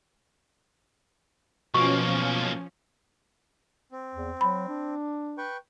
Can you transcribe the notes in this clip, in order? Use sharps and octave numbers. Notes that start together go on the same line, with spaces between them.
B1 B2 F3 A#3 C#4 C#6
C4
E2
F#3 B5
D4
B4 G5 C#6